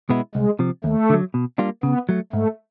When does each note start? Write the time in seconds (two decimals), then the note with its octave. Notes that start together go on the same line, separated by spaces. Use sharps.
0.09 B2 G#3 B3 E4
0.35 C2 G#3
0.59 C3 F3
0.84 D#2 A3
1.10 D3 F#3
1.34 B2
1.58 G3 A#3 D4 F4
1.83 C#3 B3
2.09 F#3 A3
2.33 G#2 A3